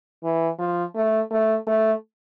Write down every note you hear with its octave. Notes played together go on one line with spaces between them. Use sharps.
E3
F3
A3
A3
A3